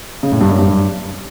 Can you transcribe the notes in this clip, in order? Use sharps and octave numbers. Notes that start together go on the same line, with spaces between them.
C#3
A2
G2
F#2
G2